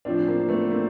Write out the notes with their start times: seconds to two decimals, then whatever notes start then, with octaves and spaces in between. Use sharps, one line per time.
0.05 A2 F3 C4 D4
0.27 A#3 C4
0.49 A3 B3
0.70 A#3 C4